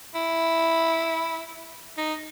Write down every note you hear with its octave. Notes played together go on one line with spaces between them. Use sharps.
E4
D#4